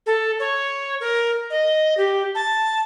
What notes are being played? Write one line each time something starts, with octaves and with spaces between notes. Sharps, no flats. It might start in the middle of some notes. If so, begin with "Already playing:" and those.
A4
C#5
A#4
D#5
G4
A5